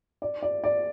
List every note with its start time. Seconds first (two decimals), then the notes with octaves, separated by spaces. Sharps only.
0.22 D5
0.43 D5
0.64 D5